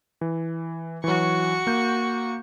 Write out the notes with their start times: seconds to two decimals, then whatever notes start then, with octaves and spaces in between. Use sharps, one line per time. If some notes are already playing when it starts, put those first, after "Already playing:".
0.21 E3
1.04 E3 F#3 F#4 C#6
1.67 A#3 G6